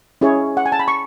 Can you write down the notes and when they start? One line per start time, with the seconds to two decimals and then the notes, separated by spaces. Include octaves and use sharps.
0.21 C#4 E4 G#4 C#5
0.57 F#5
0.66 G#5
0.72 A5
0.79 B5
0.88 C#6